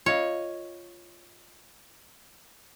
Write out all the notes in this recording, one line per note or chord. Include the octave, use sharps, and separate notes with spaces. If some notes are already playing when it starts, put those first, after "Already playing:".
F4 C#5 D#5 F5